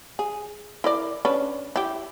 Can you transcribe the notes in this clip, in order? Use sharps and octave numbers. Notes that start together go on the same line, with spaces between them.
G#4
E4 A#4 D5
C#4 D4 B4
E4 G4